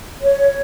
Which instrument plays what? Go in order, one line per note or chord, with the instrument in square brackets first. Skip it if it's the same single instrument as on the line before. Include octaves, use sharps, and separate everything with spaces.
[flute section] C#5